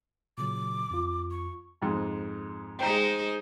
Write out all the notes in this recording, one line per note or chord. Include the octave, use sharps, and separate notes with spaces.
A#2 C#3 F#3 D6
F2 F4
C#6
F2 G#2 G#3
G#3 D#4 C5 G5 A#5